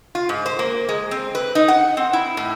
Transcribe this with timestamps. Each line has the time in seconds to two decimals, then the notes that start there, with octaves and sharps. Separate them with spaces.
0.15 F4
0.29 G#2
0.46 C5
0.59 A#3
0.89 G#3
1.11 C4
1.35 B4
1.55 D#4
1.68 F#5
1.97 C4
2.13 E4
2.37 A2